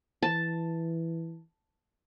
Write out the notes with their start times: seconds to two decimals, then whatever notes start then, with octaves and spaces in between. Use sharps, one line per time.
0.23 E3 A5